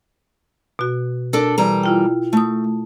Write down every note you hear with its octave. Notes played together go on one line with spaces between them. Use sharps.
B2 F#4
D4 A4 A#4
E3 G3 A#5
E4 F4 G5
A3 A5 D#6